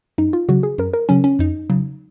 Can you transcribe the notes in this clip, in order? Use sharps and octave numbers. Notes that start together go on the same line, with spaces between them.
F#2 D#4
F4
C#3 F#3 F#4
G#4
F#2 A#4
A#4
C#3 F#3 C#4
C#4
F2 D#4
C#3 F#3